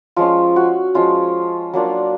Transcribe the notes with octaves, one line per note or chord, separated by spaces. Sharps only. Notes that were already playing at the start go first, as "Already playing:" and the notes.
F3 G#3 C#4 F4
F#4
F3 G#3 C#4 F4
F#3 A#3 D4 F4